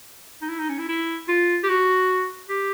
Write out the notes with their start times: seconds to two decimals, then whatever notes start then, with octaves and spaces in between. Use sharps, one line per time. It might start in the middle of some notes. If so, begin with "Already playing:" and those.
0.42 D#4
0.49 E4
0.59 D#4
0.69 C#4
0.78 E4
0.89 E4
1.29 F4
1.64 G4
1.69 F#4
2.49 G4